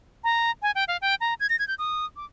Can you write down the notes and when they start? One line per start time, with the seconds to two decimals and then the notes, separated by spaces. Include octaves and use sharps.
0.24 A#5
0.62 G#5
0.75 G5
0.88 F5
1.02 G5
1.21 A#5
1.40 G#6
1.49 A#6
1.59 G#6
1.68 G6
1.79 D#6
2.16 D6